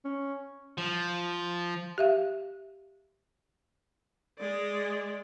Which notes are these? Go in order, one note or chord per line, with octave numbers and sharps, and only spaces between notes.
C#4
F3
G4 E5 F5
G#3 D5